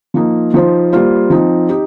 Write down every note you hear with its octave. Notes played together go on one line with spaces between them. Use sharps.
F3 A#3 D#4
F3 D#4 C5
G3 A#3 F4 C5
F3 C4 D#4
D#4 G4